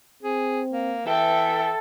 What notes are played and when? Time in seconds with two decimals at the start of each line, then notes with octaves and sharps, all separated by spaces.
0.23 C4 G#4
0.72 A#3
1.07 E3 A4 B4 E5 G5